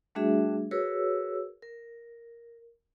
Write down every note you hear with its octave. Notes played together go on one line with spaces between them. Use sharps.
G3 A3 D4 F#4 G#4 E5
F#4 G#4 A#4 B4 C#5 E6
A#4